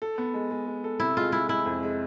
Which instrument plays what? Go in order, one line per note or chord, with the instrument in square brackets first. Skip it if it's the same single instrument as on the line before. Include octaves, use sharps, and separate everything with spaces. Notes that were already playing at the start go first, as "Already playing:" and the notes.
[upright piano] A4
B3
G#3
G#3
G#3
A4
[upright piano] C3 [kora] E4
[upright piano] G#3 [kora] F4
[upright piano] G#3 [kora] E4
[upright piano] G#3 [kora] E4
[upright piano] F2
G#3